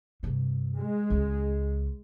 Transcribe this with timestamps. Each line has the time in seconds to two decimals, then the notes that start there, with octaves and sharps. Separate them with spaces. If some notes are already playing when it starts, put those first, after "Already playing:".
0.23 G2 C3
0.78 G#3
1.10 C#2